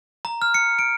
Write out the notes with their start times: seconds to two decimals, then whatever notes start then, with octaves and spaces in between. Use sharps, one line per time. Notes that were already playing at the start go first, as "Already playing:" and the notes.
0.25 A#5
0.42 F6
0.54 C#7
0.79 D7